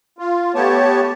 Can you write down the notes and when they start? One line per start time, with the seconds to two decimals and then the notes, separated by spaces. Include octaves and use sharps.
0.18 F4
0.55 A3 B3 G4 C#5 A5